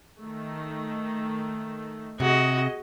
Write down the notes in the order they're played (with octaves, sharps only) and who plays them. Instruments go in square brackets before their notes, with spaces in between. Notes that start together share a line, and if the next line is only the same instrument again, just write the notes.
[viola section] D#3 A3
[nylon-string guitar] C3 [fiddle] F#4 [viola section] G#4 D#5